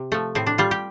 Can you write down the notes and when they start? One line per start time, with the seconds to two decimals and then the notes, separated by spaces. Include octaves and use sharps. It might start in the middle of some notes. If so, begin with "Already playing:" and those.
Already playing: C3
0.12 F3 A3
0.35 A2 C4
0.47 D4
0.58 G3 F4
0.71 G4